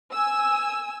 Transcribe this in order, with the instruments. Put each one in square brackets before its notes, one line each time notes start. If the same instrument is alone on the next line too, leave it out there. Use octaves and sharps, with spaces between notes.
[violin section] G#5 E6